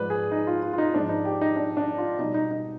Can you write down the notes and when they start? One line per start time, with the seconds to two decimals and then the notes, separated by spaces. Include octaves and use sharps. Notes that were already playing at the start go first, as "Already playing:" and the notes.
Already playing: G#2 F3 G#3 B4 D5
0.10 G#4
0.32 D#4
0.47 F4
0.62 F4
0.73 F4
0.78 D#4
0.94 G#2 F3 G#3 D4
1.09 D#4
1.25 G4
1.41 D#4
1.56 D4
1.77 D4
1.98 F4
2.19 B2 G3 D#4
2.34 D#4
2.51 D#4